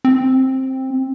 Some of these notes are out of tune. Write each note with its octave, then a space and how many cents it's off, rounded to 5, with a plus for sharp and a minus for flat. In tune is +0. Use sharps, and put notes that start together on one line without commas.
C4 +10